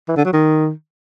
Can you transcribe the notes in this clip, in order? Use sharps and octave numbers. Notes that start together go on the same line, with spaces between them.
E3
D3
F#3
D#3